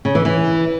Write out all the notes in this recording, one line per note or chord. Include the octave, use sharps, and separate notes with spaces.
C#3
E3
E3